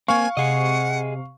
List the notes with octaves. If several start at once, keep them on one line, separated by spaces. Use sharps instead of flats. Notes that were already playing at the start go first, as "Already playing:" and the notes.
A#3 C4 F5 G#5 C#6
C3 G#4 D#5 F#5